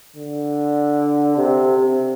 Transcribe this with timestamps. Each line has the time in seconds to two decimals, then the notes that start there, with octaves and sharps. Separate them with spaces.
0.16 D3
1.37 C3
1.77 C3